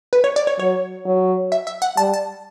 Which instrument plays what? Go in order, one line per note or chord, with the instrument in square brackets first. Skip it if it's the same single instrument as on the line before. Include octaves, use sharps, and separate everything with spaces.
[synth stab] B4
C#5
D5
C#5
[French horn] F#3 [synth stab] C#5
[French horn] F#3
[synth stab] E5
E5
F#5
[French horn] G3 [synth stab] A5
[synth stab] A5